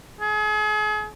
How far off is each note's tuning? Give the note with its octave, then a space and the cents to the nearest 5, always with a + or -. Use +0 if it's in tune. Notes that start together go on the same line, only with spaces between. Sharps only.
G#4 +35